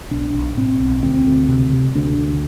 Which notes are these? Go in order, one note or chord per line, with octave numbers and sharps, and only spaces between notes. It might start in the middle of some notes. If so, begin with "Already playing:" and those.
B1 D4
B1
A2 C4
B1
D2 C4
D2
C3
C3
D2 D4
D2